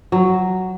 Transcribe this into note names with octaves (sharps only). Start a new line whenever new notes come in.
F#3